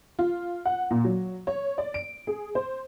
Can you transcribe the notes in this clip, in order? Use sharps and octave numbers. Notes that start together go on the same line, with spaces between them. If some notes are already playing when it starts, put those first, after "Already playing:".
F4
F#5
A#2
F#3
C#5
D5
D7
G#4
C5